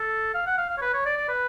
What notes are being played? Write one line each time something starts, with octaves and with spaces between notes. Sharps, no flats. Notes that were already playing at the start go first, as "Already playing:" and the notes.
Already playing: A4
F5
F#5
F5
F5
C#5
B4
C#5
D5
D5
B4